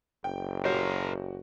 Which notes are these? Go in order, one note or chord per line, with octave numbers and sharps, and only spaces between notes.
F#1 G5
F#4 G4 A#4 C5 C#5